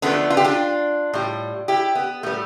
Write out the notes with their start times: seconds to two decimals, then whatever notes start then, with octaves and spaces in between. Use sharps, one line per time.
0.02 D3 F3 A3 B3 D4
0.30 F4
0.37 G4
0.44 D4 F4
1.13 A2 G3
1.68 E4 G4
1.95 B3
2.23 A2 G3 A3